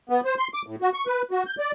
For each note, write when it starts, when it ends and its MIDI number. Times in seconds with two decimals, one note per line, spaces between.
0.09 0.21 59
0.25 0.35 72
0.38 0.48 84
0.54 0.62 86
0.66 0.76 45
0.82 0.89 66
0.93 1.06 85
1.06 1.22 71
1.31 1.43 66
1.46 1.56 91
1.59 1.72 74